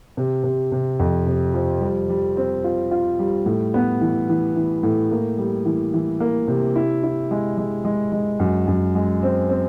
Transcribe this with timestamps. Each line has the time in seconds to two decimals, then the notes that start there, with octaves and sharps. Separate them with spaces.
0.17 C3
0.44 C3
0.72 C3
0.99 F2
1.26 C3
1.54 F3
1.81 G3
2.09 G3
2.37 C4
2.64 F4
2.91 F4
3.19 G3
3.46 A2
3.74 B3
4.01 E3
4.29 E3
4.56 E3
4.83 A2
5.11 A#3
5.38 G3
5.65 E3
5.93 E3
6.20 A#3
6.48 C3
6.76 E4
7.03 E4
7.31 G#3
7.58 G#3
7.85 G#3
8.12 G#3
8.40 F#2
8.68 F#2
8.95 G#3
9.23 C4
9.49 C4